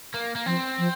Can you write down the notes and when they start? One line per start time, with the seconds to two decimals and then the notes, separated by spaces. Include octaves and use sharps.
0.14 A#3
0.35 A#3
0.46 F3 C4
0.78 F3